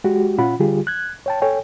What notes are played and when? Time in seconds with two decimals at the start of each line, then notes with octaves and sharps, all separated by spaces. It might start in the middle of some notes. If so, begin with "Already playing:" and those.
0.04 G#3 F#4 G4
0.38 A#2 C#4 F4 F#5 B5
0.60 D3 G3 F4 G4 G#4
0.87 F#6 G#6
1.26 C#5 G5 A5
1.41 A4 C#5 G5 G#5